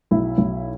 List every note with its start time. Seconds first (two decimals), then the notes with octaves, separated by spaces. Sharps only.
0.11 B1 E4
0.38 B1